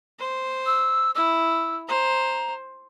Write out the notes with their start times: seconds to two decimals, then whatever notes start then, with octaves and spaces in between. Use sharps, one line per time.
0.19 C5
0.66 E6
1.15 E4 E6
1.88 C5 A#5